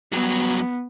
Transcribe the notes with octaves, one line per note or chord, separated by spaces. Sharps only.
G2 F#3 B3